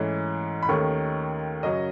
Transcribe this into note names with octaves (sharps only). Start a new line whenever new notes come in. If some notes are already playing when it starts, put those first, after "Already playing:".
Already playing: G#2 E3 A3 C#4
B5
D#2 D#3 A3 C#4 C#6
F#2 C#3 F#3 C#4 D#5